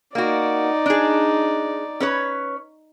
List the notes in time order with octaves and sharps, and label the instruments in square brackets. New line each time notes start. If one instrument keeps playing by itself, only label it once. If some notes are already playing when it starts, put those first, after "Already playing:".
[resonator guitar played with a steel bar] A#3 F#4 [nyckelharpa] D#4 D5
[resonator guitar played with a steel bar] D4 G#4
C#4 B4 C#5